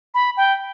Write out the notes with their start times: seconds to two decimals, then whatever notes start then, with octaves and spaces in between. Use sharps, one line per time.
0.14 B5
0.37 G5